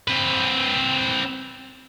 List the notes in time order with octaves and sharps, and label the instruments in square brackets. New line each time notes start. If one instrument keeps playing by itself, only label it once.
[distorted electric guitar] C4 B4